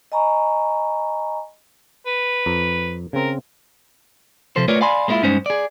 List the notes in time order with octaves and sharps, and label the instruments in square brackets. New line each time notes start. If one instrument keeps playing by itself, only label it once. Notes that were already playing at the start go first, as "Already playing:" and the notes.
[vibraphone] D#5 G#5 A#5 B5 C#6
[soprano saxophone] B4
[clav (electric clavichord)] F2 A#5
[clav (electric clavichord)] C#3 C4 [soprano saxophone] A#4
[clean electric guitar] C3 F3 A4 C5
A3 F4 A#4 B4 C#5 D5
D5 F5 G#5 B5 C6
G#3 A#3 C#4 E4 F4
G2 G#3 C#4 D#4 C5
G#4 D5